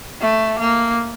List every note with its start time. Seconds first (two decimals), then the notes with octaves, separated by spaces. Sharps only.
0.21 A3
0.59 A#3